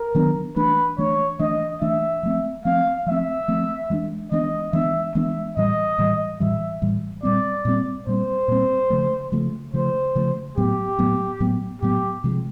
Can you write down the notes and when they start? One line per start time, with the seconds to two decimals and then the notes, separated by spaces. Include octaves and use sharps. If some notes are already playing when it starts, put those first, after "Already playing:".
Already playing: A#4
0.15 D#3 F#3 B3 D4
0.56 E3 A3 D4 B4
0.98 E3 A3 D4 C#5
1.39 E3 A3 D4 D#5
1.81 E3 A3 D4 E5
2.23 F3 A3 C4
2.65 F3 A3 C4 F5
3.06 F3 A3 C4 E5
3.48 F3 A3 C4
3.90 E3 G#3 B3 D4
4.32 E3 G#3 B3 D4 D#5
4.73 E3 G#3 B3 D4 E5
5.15 E3 G#3 B3 D4 E5
5.57 A2 E3 G3 D#5
5.98 A2 E3 G3
6.40 A2 E3 G3 E5
6.82 A2 E3 G3
7.23 A#2 G3 C4 D5
7.65 A#2 G3 C4
8.07 A#2 G3 C4 C5
8.48 A#2 G3 C4
8.90 C#3 F3 A3
9.32 C#3 F3 A3
9.73 C#3 F3 A3 C5
10.15 C#3 F3 A3
10.57 A2 F#3 B3 G4
10.99 A2 F#3 B3
11.40 A2 F#3 B3
11.82 A2 F#3 B3 G4
12.24 C3 F3 G#3